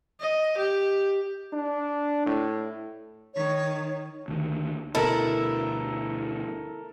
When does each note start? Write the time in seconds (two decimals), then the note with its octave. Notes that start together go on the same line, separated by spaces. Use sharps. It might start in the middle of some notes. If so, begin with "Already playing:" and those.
0.20 D#5
0.58 G4
1.53 D4
2.26 A2
3.34 D#3 C#5
4.28 D2 D#3
4.95 D2 B2 E4 A4 A#4